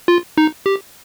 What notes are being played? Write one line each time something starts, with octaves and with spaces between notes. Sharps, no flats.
F4
D#4
G4